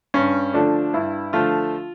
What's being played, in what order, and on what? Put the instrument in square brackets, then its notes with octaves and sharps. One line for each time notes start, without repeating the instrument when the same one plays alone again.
[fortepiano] G2 C#4
D3 F3 A3 D4
G2 E4
D3 F3 A3 F4